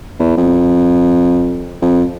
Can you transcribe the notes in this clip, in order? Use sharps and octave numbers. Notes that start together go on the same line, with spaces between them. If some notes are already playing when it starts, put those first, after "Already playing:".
E2
F2
F2